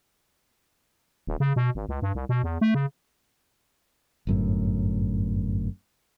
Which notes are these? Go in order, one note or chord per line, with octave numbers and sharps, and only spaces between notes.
D#1
C#3
B2
G#1
C#2
G2
C2
B2
E2
A3
C#3
G1 F#2 A2